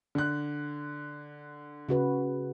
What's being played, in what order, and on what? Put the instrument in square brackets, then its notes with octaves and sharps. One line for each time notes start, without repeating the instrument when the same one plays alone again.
[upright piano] D3 F#6
[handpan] C#3 F#4 B4